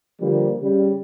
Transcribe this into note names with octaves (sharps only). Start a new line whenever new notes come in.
D3 F3 G3 A#3
C#3 G3